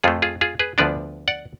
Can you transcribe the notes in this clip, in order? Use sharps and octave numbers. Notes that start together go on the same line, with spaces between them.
F2 F3 A3 F4 G#4
F4 G#4
F4 G#4
G#4 B4
D2 D3 F3 B3 D4 B4 D5
D5 F#5